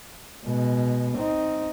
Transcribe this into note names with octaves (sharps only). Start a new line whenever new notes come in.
B2 G#3
C4 D#4